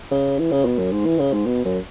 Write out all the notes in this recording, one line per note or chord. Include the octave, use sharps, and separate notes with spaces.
C#3
E3
C#3
B2
F#2
G#2
E3
C#3
G#2
B2
F#2